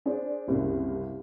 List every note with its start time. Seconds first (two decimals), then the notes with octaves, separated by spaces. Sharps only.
0.06 D4 G#4 C5
0.47 F#1 C2 C#3 A#3